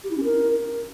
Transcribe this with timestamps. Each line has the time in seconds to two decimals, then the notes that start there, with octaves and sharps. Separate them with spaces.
0.04 G4
0.10 E4
0.17 C#4
0.24 A#4